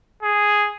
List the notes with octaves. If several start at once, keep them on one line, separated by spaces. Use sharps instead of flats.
G#4